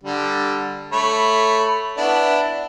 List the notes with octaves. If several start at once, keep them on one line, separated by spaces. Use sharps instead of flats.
D3 G3
A3 C#5 B5
B3 D4 E4